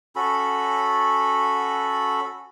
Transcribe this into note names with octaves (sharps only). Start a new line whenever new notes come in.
C#4 F#4 A4 B5